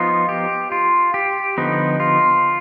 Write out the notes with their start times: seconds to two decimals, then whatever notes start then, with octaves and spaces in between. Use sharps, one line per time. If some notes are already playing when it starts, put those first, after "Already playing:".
Already playing: F3 B3 D#4 F4
0.29 G4
0.72 F4
1.14 G4
1.58 D3 F3 B3 D#4
2.00 F4